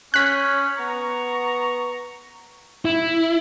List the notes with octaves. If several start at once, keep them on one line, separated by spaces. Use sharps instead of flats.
C#4 F#6 B6
B3 A#5 C#6
E4